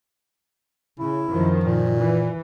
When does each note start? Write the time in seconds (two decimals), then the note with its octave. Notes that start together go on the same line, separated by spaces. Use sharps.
0.99 C#3 E4
1.28 F#2 D#3 F3
1.64 A#2
1.97 E3